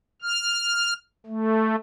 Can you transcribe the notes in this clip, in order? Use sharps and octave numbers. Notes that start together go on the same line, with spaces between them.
F6
A3